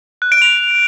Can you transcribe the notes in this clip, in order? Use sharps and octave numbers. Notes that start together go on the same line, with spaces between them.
F#6
D7
F7